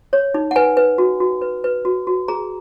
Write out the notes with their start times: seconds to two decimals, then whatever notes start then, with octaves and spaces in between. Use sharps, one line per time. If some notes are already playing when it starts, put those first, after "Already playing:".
0.13 C#5
0.34 D#4
0.51 F#5
0.56 B4 G#5
0.77 B4
0.98 F#4
1.20 F#4
1.41 B4
1.64 B4
1.85 F#4
2.07 F#4
2.28 G#4 A#5